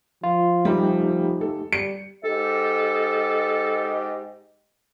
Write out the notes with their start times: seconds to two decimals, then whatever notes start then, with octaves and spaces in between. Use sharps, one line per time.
0.24 F3 F4
0.65 G3 A3 D#4 G4
1.41 A4
1.73 G3 C#7
2.25 G#2 G4 A4 D#5